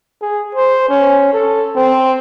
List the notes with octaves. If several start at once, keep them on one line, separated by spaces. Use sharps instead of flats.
G#4
C5
C#4
A4
C4